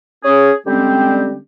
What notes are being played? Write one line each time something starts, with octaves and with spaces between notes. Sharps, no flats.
C#4 G#4
D3 G3 G#3 C4 C#4 G4